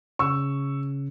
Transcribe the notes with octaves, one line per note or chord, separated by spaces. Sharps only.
C#3 C#6 E6